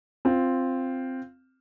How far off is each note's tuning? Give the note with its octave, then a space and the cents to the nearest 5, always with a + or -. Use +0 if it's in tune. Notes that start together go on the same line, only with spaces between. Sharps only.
C4 +0 F4 +0